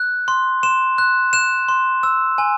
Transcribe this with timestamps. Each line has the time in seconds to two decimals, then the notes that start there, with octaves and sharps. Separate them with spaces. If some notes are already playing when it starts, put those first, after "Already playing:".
Already playing: F#6
0.28 C6
0.63 C6 E7
0.98 F#6
1.33 F#6 E7
1.68 C6
2.03 E6
2.38 G#5